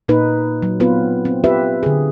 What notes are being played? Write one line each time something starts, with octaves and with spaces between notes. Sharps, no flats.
A#2 A#3 D#4 B4
F#3
B3 C4 F4 B4
C4
F4 G4 B4 E5
D3 G#4